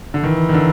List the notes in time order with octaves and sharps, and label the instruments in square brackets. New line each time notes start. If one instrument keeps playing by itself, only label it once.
[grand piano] D3
[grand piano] D#3 [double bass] E3
[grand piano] D#3
D3